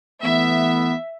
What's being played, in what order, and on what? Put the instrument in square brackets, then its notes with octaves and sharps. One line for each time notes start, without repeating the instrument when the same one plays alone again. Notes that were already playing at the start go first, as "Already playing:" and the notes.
[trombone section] E3 A3 B3 [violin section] E5